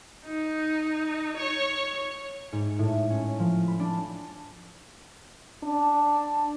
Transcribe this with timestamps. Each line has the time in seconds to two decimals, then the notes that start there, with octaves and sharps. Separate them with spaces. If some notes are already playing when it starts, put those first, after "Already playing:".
0.24 D#4
1.37 C#5
2.53 G#2
2.79 A2
3.10 C#4
3.39 F3
3.67 B5
3.80 D4
5.64 D4